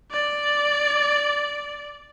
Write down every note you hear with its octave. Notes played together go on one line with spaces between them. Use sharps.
D5